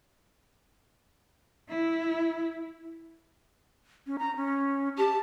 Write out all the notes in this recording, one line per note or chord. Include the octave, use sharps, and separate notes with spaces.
E4
C#4
A#5
C#4
G4 A5